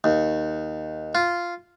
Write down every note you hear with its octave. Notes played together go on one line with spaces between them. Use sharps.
D#2
F4